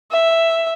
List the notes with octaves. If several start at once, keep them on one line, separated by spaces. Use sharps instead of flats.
E5